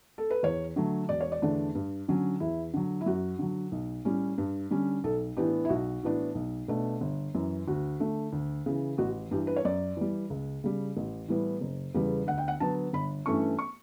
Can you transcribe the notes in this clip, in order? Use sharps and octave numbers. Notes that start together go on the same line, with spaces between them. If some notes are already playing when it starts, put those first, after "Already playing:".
A4
B4
E2 C#5
D3 F#3 A3
E1 D5
C#5
D5
E2 D3 A3 D4
G2
D3 F#3 C#4
E2 E4
D3 F#3
E4
F#2 F#4
D3 F#3
B1
A2 G3 C#4
G2
D3 G3 C#4
B1 A4
A2 E3 B3 D4 G4
E4
B1 F#4
A2 E3 B3 D4
B1
B2 A3 D4
G1
F#2 E3
D2 F#4
D3 A3
D2
C#3 E3
A1 F#4
G2 E3 G4
B4
C#5
F#2 D5
E3 G3
C#2
C#3 G3
A1
A2 E3 G3 B3
F#1
E2 C#3 G3 B3
D2 F#5
G5
F#5
D3 F#3 B3 A5
G1 B5
G2 E3 A3 C#4 C#6
C#6